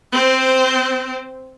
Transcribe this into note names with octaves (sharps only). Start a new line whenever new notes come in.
C4 C5